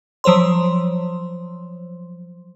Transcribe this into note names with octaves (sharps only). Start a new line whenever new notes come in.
F3 F#3 C5 C#5 C6